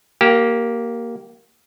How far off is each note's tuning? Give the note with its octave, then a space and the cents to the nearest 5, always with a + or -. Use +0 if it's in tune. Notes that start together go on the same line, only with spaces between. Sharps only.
A#3 +0 G4 -15